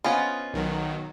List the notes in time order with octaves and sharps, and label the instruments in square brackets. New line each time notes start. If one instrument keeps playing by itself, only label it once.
[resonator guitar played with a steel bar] B3 C5 D#5 [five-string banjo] C#4 F4
[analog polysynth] B1 D#3 F#3